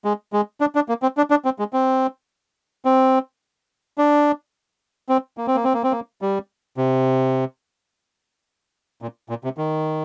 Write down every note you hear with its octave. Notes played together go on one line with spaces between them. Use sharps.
G#3
G#3
D4
D4
A#3
C4
D4
D4
C4
G#3
C4
C4
D4
C4
A#3
C4
A#3
C4
A#3
C4
A#3
G3
C3
A#2
A#2
C3
D#3